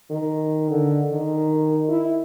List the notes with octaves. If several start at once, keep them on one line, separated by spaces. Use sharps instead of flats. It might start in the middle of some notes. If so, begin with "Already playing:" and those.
D#3
D3
D#3
E4